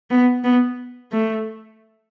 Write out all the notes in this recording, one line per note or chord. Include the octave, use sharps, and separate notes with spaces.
B3
B3
A3